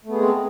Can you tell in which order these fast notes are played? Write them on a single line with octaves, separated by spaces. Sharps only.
A3 B3 G#4 G#3 C4